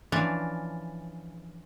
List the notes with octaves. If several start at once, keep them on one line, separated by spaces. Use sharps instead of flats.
E3 F3 C#4 D4